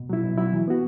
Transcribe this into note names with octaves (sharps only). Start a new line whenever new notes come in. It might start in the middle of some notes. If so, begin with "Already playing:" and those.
Already playing: B2
F#3 E4
B2
F#3 E4
E3
B3 F#4